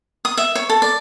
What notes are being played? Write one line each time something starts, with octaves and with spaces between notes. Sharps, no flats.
D#6
E5
C#5
A4
D5